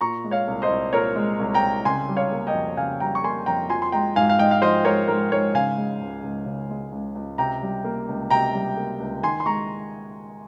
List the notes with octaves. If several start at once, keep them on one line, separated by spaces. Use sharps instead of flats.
A#2 A#5 C#6
G#3
C#5 F5
C2
C5 D#5
C2
A#2 A#4 C#5
G#3
C2
G5 A#5
C2
C#3 G#5 C6
G3
C#5 F5
A#3
D#5 G5
F2
C#3 F5 G#5
G3 G5 A#5
C#6
A#3 G#5 C6
F2 G5 A#5
F3 G#5 C6
C6
G#3 G5 A#5
G#2 F5 G#5
F5
G#2 D#5 G5
F5
F3 C5 D#5
G#3 A#4 C#5
G#2 A#4
G#2 A#4 C#5
C#3 F5 G#5
G#3
C#2
C#2
C#3
G#3
C#2
C#2
C3 G5 A#5
G3
A#3
C#2
C3 G5 A#5
G3
A#3
C#2
D#3 G#5 C6
C6
G#3 A#5 C#6